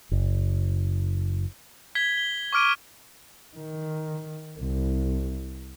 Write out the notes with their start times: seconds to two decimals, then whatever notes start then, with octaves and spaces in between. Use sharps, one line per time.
0.11 F#1
1.95 G#6 B6 G7
2.17 G7
2.53 C#6 D6 F6 D7 D#7
3.55 D#3
4.58 C2